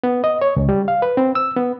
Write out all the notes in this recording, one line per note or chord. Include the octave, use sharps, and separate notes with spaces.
B3
D#5
C#5
C#2
G3
F5
B4
C4
E6
B3